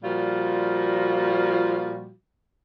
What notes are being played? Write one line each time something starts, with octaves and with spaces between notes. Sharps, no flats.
A#2 F3 G3 F4 F#4